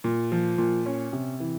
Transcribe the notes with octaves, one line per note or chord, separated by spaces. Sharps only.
A#2
F3
A#2
C#4
C3
E3